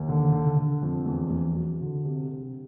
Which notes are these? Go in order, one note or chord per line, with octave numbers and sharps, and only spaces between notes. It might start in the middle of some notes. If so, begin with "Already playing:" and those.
Already playing: D#2
D3
D3
D3
F2
E2
E2
F#3
D3
C3
C3